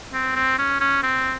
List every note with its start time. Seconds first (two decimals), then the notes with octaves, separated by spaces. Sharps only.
0.13 C4
0.36 C4
0.58 C#4
0.80 C#4
1.03 C4